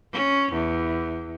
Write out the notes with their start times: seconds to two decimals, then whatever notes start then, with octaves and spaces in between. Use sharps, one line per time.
0.13 C#4
0.52 E2